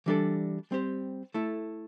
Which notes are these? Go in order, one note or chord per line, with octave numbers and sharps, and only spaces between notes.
E3 G3 D4 A4 D5
G3 C4 G4 C5
A3 E4 A4